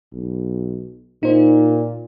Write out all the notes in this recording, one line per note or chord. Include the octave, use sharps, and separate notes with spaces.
B1
A#2 D#4 C5